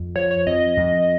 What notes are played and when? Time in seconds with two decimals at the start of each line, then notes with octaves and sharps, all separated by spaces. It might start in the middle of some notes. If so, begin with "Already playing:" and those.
Already playing: F2
0.15 F3 C#5
0.31 C#5
0.47 F2 D#5
0.77 F2